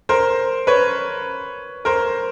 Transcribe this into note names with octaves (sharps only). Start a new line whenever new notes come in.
A#4 C5
B4 C#5
A#4 C5